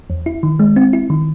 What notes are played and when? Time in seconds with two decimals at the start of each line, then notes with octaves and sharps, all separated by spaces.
0.10 E2
0.26 E4
0.43 D#3
0.59 G#3
0.76 C4
0.93 E4
1.10 D#3